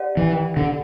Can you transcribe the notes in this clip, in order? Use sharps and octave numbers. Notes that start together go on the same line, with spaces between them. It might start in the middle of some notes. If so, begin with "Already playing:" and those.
Already playing: G4 D5 F#5
E3
D3